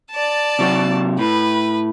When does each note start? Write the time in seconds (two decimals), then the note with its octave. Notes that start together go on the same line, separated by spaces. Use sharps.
0.11 D5 A5
0.59 C3 F#3 C#5
1.19 A2 B4